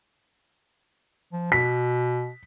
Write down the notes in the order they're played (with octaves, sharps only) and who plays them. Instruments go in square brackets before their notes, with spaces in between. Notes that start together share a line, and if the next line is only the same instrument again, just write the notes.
[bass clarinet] F3
[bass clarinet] B2 [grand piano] B6